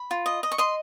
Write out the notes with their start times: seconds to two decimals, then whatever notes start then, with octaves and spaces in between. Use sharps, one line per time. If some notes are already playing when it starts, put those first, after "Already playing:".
Already playing: B5
0.11 F4
0.26 D#5
0.43 D#5
0.52 C#6
0.58 D#5 C6